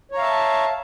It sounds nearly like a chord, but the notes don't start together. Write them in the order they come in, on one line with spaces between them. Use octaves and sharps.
C#5 A#5 F5 E5 A5